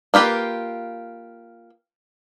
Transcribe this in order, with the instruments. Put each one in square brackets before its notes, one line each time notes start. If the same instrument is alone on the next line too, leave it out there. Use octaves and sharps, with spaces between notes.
[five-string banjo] A#3 F4 G4 B4